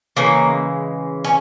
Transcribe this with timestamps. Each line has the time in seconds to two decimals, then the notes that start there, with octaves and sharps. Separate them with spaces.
0.16 C#3 E3 G#3 A#3
1.24 C#4